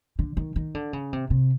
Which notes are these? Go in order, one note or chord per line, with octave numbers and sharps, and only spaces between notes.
D3
D#3
D#3
D3
C#3
C3
C3